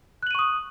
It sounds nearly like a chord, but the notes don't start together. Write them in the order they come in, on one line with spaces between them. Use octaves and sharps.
F#6 F#7 D#7 C#6 D#6